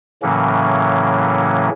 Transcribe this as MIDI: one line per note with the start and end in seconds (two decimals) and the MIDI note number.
0.22 1.69 45
0.22 1.69 49
0.22 1.69 52
0.22 1.69 54
0.22 1.69 58
0.22 1.69 61